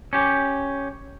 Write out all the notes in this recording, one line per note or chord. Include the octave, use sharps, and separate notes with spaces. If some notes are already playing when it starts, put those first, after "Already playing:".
C#4 G4